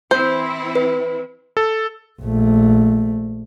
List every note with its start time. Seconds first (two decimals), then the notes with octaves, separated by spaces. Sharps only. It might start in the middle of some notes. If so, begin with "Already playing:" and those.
0.11 E3 C4 E4 C5
0.75 B4
1.57 A4
2.21 A#1 A3